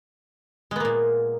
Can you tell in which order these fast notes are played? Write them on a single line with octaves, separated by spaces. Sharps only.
G#3 B3 A#3 A#2